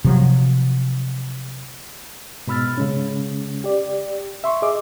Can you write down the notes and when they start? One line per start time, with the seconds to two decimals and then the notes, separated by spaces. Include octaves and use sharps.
0.05 C3 F3 F#3
2.47 G#2 B2 B5 E6 F6 A6
2.78 C#3 G#3 C#4
3.64 G4 D5
4.44 E5 C6 C#6
4.62 G#4 D#5 E5 D6